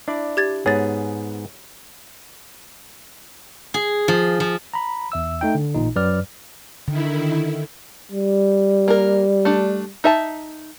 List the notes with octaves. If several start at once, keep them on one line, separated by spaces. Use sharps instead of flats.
D4 E4 D5
G4 G#6 A6
G#2 B3 G#4 C#5 A6
G#4
F3
F3
A#5 B5
E2 E5 E6
A3 D#4 G5
D3
A1 A#2 D#4
F#2 F#3 B4 D5 F6
D3 D#3 E4
G3
A#3 A#4
A3 D4
D#4 E5 A5